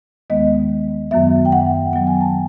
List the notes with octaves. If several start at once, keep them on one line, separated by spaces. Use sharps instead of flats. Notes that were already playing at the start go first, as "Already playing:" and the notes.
D#2 D#3 G#3 B3 D#5
F#2 D#3 F#3 B3 E5
G5
F#5
D#3 F#3 B3 G5
G#5
A5